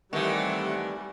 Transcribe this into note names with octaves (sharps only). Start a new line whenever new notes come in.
D#3 E3 G3 A3 C4 F#5